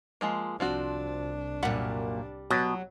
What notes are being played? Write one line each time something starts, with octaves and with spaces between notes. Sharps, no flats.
F3 G#3 A#3
C2 F3 C4 D4 F#4
F#2 A#2 G3 F#5 B5
B2 F#3